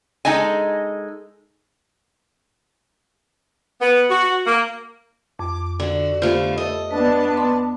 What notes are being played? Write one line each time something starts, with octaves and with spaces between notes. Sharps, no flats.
G#3 D#4 A4 D#5 G#5
B3
F#4
A#3
F2 D6
D3 F#4
D3 A3 B3 F4 G4 C5 F5
A4 D#5
B3 D4 B4 A5
C6